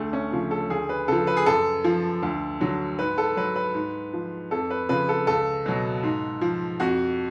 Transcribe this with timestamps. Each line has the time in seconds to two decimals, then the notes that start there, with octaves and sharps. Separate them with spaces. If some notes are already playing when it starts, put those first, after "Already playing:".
Already playing: D2 A3
0.13 C#4
0.32 C#3 F3
0.51 A4
0.70 D2 G#4
0.89 B4
1.08 C#3 F3 A4
1.27 B4
1.37 G#4
1.46 F#2 A4
1.84 F3
2.23 D2
2.61 D3 F#3
2.99 G#2 B4
3.18 A4
3.37 F#3 B4
3.56 B4
3.74 G#2
4.13 F3
4.51 F2 A4
4.70 B4
4.89 C#3 F3 B4
5.09 A4
5.27 C#2 A4
5.66 B2 F#3
6.03 G#2
6.41 F3
6.80 F2 F#4